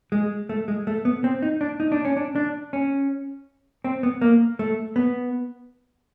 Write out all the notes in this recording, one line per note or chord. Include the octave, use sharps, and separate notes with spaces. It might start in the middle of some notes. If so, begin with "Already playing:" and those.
G#3
A3
G#3
A3
B3
C4
D#4
D4
D#4
D4
C#4
D4
D4
C#4
C4
B3
A#3
A3
B3